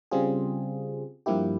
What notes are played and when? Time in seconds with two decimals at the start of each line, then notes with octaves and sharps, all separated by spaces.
0.11 C#3 G3 C4 F4 G#4
1.26 G2 F3 A#3 E4 G4